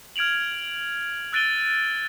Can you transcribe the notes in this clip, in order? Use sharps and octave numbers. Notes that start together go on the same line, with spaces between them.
F6 G#6 D7 F7 F#7
E6 F#6 A6 D7 D#7 G7